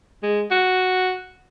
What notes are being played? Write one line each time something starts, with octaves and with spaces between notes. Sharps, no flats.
G#3
F#4